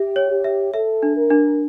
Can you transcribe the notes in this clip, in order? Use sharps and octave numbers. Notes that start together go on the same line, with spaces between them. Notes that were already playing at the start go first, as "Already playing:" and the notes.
Already playing: G4 E5
C#5
G4
E5
A4 E5
D4
A#4
D4